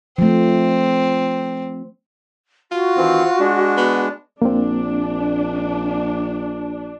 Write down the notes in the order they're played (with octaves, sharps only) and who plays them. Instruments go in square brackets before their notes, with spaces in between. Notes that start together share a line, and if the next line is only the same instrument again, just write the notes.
[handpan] F3 A3 [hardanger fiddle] C4
[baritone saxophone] F4 [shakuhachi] F#4
[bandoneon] D#3 E3 C4
G#3 D4
[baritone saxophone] B3
[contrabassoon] A#1 [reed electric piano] A#3 C4 [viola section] D4